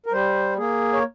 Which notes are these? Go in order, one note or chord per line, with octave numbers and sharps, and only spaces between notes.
A#4
G3 C5
A#3 G#4
C#5